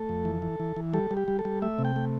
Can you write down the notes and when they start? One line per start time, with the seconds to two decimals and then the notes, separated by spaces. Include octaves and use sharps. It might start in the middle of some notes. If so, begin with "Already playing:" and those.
Already playing: A3 A4
0.09 F2
0.25 E3
0.42 E3
0.60 E3
0.76 E3
0.94 G3 A4
1.11 G3
1.17 G4
1.28 G3
1.39 A4
1.45 G3
1.62 A3 E5
1.79 C3
1.85 G5
1.96 A3